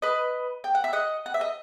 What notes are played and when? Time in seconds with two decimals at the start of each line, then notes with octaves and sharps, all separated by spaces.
0.02 B4 D#5
0.64 G5
0.75 F#5
0.84 E5
0.93 D#5 F#5
1.26 F#5
1.34 E5
1.41 D#5